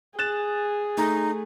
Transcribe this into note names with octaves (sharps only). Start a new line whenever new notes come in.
G#4 F#6 A6 E7
A3 D#4